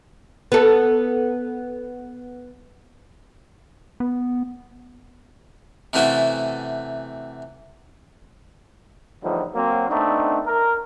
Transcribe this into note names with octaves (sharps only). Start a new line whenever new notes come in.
B3 A4
B3
C3 E3 A3 C#4 F#4 A4
E2 A2 D3 F3 G3 D#4
F#3 A#3 C4
A3 B3 C4 D4 D#4
A#4